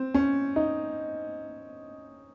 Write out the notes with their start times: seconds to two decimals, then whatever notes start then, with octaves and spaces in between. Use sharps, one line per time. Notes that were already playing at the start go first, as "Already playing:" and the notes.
Already playing: C4
0.14 C#4
0.56 D#4